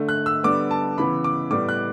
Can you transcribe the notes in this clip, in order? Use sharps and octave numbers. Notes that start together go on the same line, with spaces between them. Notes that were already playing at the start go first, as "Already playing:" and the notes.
Already playing: D3 A3
F#6
E6
D3 G3 B3 D6
A5
C#3 E3 B3 B5
D6
A2 G3 B3 D6
F#6